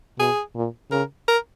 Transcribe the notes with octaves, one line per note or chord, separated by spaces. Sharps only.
B2 G#4
A#2
C#3 A#4
A#4